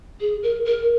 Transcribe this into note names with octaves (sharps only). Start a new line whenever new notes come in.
G#4
A#4
A#4